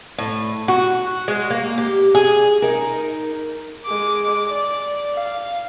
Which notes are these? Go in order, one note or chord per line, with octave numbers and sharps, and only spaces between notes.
A2
F#4
G#3
A#3
G4
G#4
D#4 A#4
G#3 D6
D5
F5